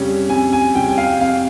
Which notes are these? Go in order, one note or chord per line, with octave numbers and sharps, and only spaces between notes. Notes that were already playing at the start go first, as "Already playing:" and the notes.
Already playing: F2 C#3 G3 C#4
F2 G#5
G#5
C#3 G3 C#4 G5
G5
F5
F2 F5